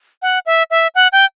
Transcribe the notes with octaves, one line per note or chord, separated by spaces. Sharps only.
F#5
E5
E5
F#5
G5